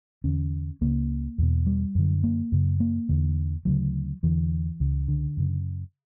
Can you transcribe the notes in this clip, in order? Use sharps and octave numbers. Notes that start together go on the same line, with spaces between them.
E2 D3 C#4
C#2 C#3 A#3
E2 B2
G3
F#2 D3
A#3
F#2 C#3
A#3
E2 D3
D2 C#3 F#3
E2 D3 E3
C#2 C#3
D3
F#2 C#3